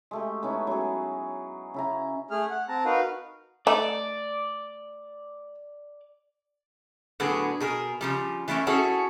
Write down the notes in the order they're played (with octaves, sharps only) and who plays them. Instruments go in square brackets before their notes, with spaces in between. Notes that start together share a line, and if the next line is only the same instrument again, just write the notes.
[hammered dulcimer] G#3 A3 G4
B3 C#4 D#4 E4
F#3 G#4
C#3 E4 A#5
[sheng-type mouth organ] A3 G#4 F6
F#5
C4 A5 A#5
D#4 F#4 A#4 B4 F5
[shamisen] A3 D#4 [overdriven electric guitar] D5
[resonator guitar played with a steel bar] A2 D3 F#3 B3 G#4
B2 G#4 A#4
C#3 F3 G3
E3 A3 A#3 C#4 E4
C#4 E4 F#4 G#4 A4 C#5